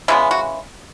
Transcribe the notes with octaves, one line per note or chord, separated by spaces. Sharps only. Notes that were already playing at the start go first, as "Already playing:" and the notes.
C#3 E3 G#3 B3 E4
F#4